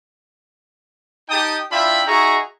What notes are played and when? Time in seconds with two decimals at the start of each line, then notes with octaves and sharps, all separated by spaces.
1.29 D#4 G4 G5 A5 D#6
1.71 D4 E4 F4 E5 G5 B5
2.07 D#4 F#4 G#4 E5 A#5 C#6